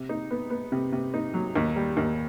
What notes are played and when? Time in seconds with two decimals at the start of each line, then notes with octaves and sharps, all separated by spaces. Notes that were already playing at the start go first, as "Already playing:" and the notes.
Already playing: C3
0.09 D#4
0.31 B3
0.50 B3
0.72 C3
0.92 C3
1.14 D#4
1.34 F#3
1.56 D#2
1.76 G3
1.97 D#2